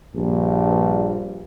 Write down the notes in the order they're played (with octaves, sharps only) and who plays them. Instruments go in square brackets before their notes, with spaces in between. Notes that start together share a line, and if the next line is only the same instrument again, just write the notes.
[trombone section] A#1 G2